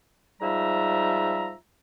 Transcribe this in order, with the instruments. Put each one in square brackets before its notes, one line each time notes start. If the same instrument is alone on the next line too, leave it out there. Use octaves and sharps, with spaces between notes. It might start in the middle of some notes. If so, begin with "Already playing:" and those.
[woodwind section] G#2 F3 G3 E5 A#5